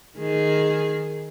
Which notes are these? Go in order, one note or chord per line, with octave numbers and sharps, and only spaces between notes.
D#3 G#4